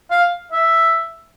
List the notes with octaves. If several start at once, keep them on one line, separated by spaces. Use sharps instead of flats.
F5
E5